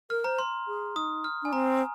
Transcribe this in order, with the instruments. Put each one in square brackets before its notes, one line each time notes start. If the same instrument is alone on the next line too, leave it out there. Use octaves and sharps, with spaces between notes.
[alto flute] A#4 [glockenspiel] F6
[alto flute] C5 [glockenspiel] A#5
[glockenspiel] C6
[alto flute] G#4
[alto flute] D#4 [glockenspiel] D#6
[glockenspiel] F6
[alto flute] D4 [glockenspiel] G#5
[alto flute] C4 [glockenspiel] A#5